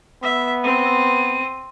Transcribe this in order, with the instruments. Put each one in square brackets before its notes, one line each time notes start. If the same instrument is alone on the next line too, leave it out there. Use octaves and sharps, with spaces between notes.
[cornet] B3 [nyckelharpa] E5
[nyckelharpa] C4 [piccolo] D#7